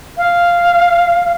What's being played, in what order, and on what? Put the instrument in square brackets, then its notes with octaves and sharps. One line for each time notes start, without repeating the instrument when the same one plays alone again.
[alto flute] F5